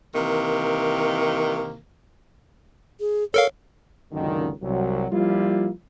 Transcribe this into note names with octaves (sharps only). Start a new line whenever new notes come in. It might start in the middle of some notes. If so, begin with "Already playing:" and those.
C3 D#3 E3 A#3
G#4
A4 A#4 C#5 F5
C#2 F#2 A#2 D3 D#3
C2 F#3
F3 G3 A#3 E4 F4